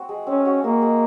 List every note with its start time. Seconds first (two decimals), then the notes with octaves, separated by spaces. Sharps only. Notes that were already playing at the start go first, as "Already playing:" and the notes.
Already playing: C4 F#4
0.09 G#3
0.27 C4 C#4
0.45 F#4
0.63 G#3 A#3
0.82 G#3